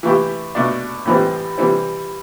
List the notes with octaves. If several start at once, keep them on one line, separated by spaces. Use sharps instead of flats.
E3 A3 E4 G4
B2 A3 D4
A2 E3 G3 C4
E3 G3 C4